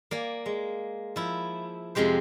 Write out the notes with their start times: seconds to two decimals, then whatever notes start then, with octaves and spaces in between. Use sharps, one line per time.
0.11 A#3 D5 G#5
0.46 G#3
1.16 F3 E4
1.95 F2 C3 G#3 G4 C5